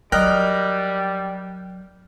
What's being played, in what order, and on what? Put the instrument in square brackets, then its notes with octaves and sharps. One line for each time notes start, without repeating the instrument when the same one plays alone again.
[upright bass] F#3 [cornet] G3 [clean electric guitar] A#4 D5 D#5 [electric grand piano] G5 F6 F#6